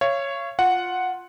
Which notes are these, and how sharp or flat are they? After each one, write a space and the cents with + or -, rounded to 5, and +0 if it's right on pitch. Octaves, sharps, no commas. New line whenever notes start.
C#5 +0 F5 -40
F4 +10 F#5 -5